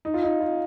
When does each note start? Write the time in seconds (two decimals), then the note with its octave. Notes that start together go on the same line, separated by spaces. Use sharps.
0.05 D#4
0.14 F4
0.23 D#4
0.40 F4